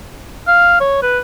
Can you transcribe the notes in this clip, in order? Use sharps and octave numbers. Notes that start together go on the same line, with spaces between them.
F5
C#5
B4